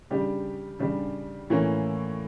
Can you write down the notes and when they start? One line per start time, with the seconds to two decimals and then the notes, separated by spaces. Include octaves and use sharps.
0.10 C#3 G3 D4 G4
0.79 C#3 G3 D4
1.50 A2 E3 A#3 C#4